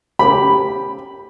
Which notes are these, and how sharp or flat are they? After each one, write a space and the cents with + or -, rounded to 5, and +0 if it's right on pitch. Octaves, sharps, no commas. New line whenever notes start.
G4 +0 B5 +0